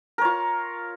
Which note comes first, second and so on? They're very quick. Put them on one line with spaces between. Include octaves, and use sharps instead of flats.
A#4 C#5 F4